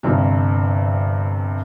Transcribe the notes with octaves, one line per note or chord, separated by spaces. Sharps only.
G1 G2 C3